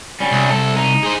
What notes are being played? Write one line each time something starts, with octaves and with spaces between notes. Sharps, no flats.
G3 C#4
C2
A4
D#4
G#4 C5